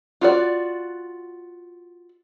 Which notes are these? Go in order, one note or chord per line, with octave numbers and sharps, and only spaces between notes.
F4 F#4 D5